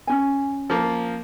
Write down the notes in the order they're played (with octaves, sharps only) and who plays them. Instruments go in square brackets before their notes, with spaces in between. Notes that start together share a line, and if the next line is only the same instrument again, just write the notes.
[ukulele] C#4 D#4 G#5
[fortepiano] F3 A#3